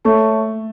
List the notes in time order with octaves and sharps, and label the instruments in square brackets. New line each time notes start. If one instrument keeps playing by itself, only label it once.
[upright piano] A3 [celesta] C#5 E5 A5 C#6